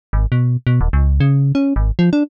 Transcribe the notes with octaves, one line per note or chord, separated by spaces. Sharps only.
G#1
B2
B2
D#1
C#2
C#3
C#4
G#1
F3
D4